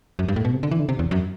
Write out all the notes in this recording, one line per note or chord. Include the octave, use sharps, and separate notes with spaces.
F#2
G2
A2
B2
C3
D3
E3
D3
C3
E2
F#2